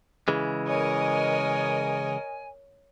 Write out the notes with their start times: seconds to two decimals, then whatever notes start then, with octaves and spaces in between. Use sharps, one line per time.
0.28 C#3 E3 G#3
0.68 A#4 C#5 D#5 G#5